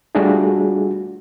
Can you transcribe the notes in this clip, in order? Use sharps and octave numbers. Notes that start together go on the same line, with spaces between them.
G3 A3 D4 F4 F#4 G#4